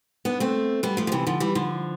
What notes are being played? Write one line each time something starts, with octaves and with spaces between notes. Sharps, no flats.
B3 D4
A3 C4
G3 B3
F3 A3
F3
C3 E3
D3 F3
E3 G3
D3 F3